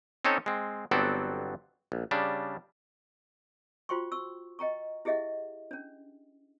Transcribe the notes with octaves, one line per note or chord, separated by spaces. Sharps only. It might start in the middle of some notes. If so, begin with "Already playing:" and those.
C4 C#4 D#4 A4 C#5
G#3 C4
G1 F#3 B3 C4 A4 D5
A#1
C#3 G3 D4
F4 F#4 C5 G5 C6 C#6
C#6 E6
D#5 G5 A#5 C#6
E4 G4 G#4 D#5 E5 F#5
C#4 D4